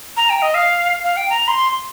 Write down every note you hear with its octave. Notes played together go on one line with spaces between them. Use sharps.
A#5
G5
D#5
F5
F5
G5
A#5
C6